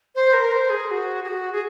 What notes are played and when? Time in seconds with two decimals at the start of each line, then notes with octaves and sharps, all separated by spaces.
0.15 C5
0.33 A#4
0.52 C5
0.69 G#4
0.87 G#4
0.91 F#4
1.24 G#4
1.28 F#4
1.52 G#4